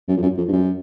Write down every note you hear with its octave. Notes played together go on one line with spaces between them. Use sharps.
F#2
F2
F#2
F2
G2
F#2